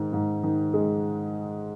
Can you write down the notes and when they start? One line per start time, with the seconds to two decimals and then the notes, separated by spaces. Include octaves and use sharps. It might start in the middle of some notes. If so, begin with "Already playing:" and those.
Already playing: G#2 D#3
0.13 G#2
0.44 D#3
0.74 G#3